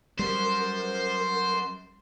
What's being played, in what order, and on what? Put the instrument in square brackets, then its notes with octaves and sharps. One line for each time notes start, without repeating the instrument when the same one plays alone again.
[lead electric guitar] F#3 C#4 [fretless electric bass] G3 [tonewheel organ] A#4 [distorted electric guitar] C5